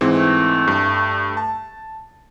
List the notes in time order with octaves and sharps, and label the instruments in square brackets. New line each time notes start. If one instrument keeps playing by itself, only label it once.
[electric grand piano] G#2 E3 C4
[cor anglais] A3
[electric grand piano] G2
A5